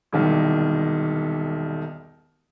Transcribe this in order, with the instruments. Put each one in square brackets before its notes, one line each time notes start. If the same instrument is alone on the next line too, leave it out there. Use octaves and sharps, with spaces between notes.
[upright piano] E1 C2 D#3